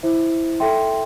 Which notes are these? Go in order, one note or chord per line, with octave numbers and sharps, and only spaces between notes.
E4 C5 E5
A4 E5 G5 C6